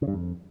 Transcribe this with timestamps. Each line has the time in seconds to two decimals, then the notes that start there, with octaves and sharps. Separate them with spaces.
0.02 C#3
0.08 G2
0.13 F2